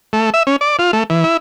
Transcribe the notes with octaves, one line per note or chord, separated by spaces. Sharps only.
A3
E5
C#4
D5
F4
A3
E3
E4